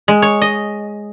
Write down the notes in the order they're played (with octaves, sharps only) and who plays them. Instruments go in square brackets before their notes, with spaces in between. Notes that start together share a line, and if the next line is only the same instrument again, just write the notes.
[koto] G#3
C#5
D#5